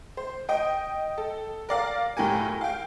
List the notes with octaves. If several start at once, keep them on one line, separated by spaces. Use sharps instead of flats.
C5
D#5 G5
A4
A#4 D5 F5
F#2 A2 G4 A#4 G#5
F5 G5